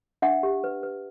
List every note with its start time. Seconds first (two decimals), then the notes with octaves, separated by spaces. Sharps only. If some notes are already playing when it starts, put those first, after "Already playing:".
0.22 D4 E5 F#5
0.43 G4
0.64 B4
0.83 B4